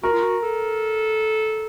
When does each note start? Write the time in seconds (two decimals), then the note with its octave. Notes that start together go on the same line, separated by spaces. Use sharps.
0.03 F#4 A#4
0.13 F4
0.22 F#4
0.43 A4